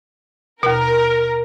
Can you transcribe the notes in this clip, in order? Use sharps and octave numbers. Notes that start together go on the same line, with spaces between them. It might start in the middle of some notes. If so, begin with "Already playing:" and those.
D#2 B2 A#4